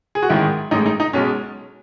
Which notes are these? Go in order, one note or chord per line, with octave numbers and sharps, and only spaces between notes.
G#4
F#4
A1 G#2 D#3 G#3 E4
A1 A2 G#3 D#4
D#4
D#4
B1 B2 G#3 C#4